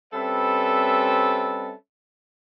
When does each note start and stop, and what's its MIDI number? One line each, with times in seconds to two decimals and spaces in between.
0.13 1.72 55
0.13 1.72 60
0.13 1.72 61
0.13 1.72 69
0.13 1.72 71
0.13 1.72 76